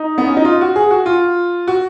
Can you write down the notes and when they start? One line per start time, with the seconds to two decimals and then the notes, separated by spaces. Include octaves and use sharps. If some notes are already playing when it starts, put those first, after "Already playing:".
Already playing: D#4
0.18 B3
0.27 C#4
0.37 D#4
0.45 F4
0.61 F#4
0.76 G#4
0.91 F#4
1.06 F4
1.68 F#4